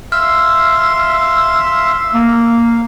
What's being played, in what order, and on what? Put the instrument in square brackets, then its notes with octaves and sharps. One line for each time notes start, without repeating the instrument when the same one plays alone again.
[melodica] E5 F5 C6 [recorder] E6 [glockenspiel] F6
[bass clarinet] A#3 [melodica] F5